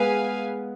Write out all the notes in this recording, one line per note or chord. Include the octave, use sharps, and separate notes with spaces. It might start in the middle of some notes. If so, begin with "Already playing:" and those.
Already playing: G#3 B3 G#4 B4 F5 G#5